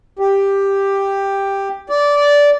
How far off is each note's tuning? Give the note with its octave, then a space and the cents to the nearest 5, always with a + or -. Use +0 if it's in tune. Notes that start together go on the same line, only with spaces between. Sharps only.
G4 +5
D5 -15